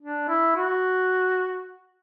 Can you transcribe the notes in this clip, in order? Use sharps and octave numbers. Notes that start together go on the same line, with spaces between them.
D4
E4
F#4